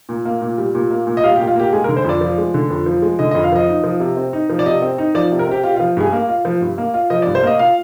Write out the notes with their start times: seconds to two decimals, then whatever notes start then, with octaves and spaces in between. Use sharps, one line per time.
0.09 A#2
0.25 A#3
0.42 A#2
0.58 G3
0.75 A#2
0.91 A#3
1.07 A#2
1.17 D#5
1.24 G3 F5
1.36 G4
1.39 A#2
1.47 F4
1.56 A#3 G4
1.73 G#3 G#4
1.84 A#4
1.88 D3
1.97 C5
2.05 F2 D5
2.21 F3
2.38 G#3
2.54 D3
2.70 F2
2.86 F3
3.02 G#3
3.19 D3 D#5
3.31 D#5
3.35 F2
3.44 F5
3.52 F3 D#5
3.69 D#4
3.84 F3
4.00 C3
4.17 C4
4.33 D#4
4.50 F3
4.59 D5
4.66 C3 D#5
4.82 C4
4.98 D#4
5.15 F3 D5
5.32 C3
5.39 A#4
5.47 C4 G4
5.64 F4 G4
5.76 F4
5.80 F3
5.97 G2 G#4
6.13 A#3
6.29 F4
6.45 F3
6.61 G2
6.78 A#3
6.94 F4
7.10 F3 D#5
7.22 D5
7.27 G2
7.35 C5
7.43 A#3 D#5
7.59 F4 F5